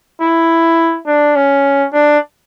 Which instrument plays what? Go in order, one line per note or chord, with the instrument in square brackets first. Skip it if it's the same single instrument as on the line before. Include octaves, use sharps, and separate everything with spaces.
[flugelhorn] E4
D4
C#4
D4